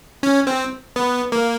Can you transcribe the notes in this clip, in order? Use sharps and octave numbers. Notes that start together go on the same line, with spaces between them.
C#4
C4
B3
A#3